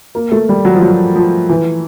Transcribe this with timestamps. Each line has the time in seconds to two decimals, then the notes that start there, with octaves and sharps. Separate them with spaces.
0.15 A#3
0.32 A3
0.49 G3
0.65 F#3
0.75 F3
0.82 F#3
1.16 F3
1.49 E3